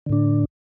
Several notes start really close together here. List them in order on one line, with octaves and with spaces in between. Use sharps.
D3 A2 D4